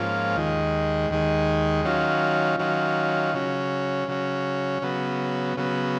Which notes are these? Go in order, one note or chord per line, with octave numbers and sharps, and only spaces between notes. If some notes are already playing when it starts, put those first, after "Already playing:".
Already playing: G#2 F3 A#3 C#4 F4
D#2 D#3 G#3
D#2 D#3 G#3
D#3 F#3 C#4 F4
D#3 F#3 C#4 F4
C#3 F#3 C#4
C#3 F#3 C#4
C#3 F#3 B3
C#3 F#3 B3